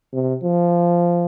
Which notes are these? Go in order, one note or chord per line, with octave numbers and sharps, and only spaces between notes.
C3
F3